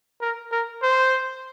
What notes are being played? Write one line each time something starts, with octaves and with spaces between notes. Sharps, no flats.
A#4
A#4
C5